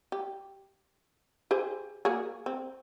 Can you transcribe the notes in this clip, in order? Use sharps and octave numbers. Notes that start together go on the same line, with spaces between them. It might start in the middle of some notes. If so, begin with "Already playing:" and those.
G4
G4 G#4 C5
A#3 F#4 G#4
C4